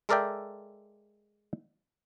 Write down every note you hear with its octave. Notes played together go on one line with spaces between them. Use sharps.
G#3 A4 A#4 D5 E5 G5